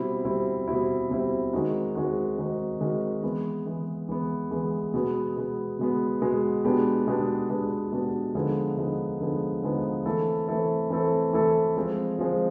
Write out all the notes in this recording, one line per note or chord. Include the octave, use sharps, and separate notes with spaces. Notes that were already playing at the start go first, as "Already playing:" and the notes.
Already playing: B2 G3 C4 E4
B2 G3 C4 E4
B2 G3 C4 E4
B2 G3 C4 E4
D#3 G#3 C4 D#4 F#4
D#3 G#3 C4 D#4 F#4
D#3 G#3 C4 D#4 F#4
D#3 G#3 C4 D#4 F#4
E3 G#3 B3
E3 G#3 B3
E3 G#3 B3
E3 G#3 B3
B2 G#3 B3
B2 G#3 B3
B2 G#3 B3
B2 G#3 B3
B2 G#3 B3 D4 G4
B2 G#3 B3 D4 G4
B2 G#3 B3 D4 G4
B2 G#3 B3 D4 G4
D3 F3 G#3 B3 D#4
D3 F3 G#3 B3 D#4
D3 F3 G#3 B3 D#4
D3 F3 G#3 B3 D#4
E3 A3 C4 E4 A4
E3 A3 C4 E4 A4
E3 A3 C4 E4 A4
E3 A3 C4 E4 A4
F3 G#3 C4
F3 G#3 C4